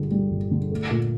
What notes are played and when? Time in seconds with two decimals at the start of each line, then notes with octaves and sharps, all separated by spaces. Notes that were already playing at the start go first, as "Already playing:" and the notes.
Already playing: G1 D3 G3
0.11 G3
0.31 G1
0.51 D3
0.72 A3
0.91 A#2